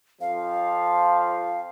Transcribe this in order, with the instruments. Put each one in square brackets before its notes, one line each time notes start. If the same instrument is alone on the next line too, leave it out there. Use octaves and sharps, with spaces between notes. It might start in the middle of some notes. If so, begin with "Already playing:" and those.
[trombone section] F2 F3 [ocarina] F5